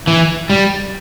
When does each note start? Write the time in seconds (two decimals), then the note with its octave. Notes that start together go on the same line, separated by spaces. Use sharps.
0.07 E3
0.50 G3